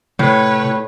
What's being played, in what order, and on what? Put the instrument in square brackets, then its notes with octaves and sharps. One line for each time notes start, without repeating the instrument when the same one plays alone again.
[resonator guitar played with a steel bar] A2 [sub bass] C3 [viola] B4 C#5